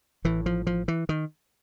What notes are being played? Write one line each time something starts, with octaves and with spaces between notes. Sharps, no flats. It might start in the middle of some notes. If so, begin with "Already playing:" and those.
A1 A2 E3
F3
F3
E3
D#3